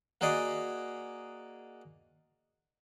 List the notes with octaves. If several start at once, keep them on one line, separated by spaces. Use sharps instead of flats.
A#3 F#4 G#4 D5 D#5 F#5